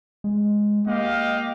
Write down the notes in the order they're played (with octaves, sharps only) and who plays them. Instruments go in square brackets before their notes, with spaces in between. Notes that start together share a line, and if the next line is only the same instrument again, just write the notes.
[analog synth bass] G#3
[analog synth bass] A#3 [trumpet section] G4 D#5 F5